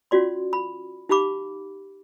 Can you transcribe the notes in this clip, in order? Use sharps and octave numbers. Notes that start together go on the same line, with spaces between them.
C#4 F4 F#4 D5 C6
B5
D#4 G4 F5 B5 D6